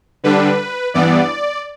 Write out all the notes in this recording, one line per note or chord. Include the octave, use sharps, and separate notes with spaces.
D3 G3 D4 B4
G2 E3 B3 D5